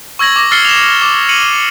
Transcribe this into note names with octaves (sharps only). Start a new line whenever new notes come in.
C#6 E6 G#6 A#6 F#7
D6 A#6
E6 F6 A6 C7 C#7 G7
E7 F7
D6
C#7 D#7 F#7